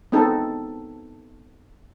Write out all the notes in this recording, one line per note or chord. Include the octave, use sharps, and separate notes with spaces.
B3 C4 D#4 A4